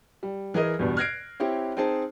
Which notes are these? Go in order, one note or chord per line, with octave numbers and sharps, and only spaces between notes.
G3
E3 G#4 A#4 D#5
E2 G2 B2
F6 F#6 G#6 A#6 C7 D7
C4 E4 G4 C#5
C4 D#4 G#4 C5 A5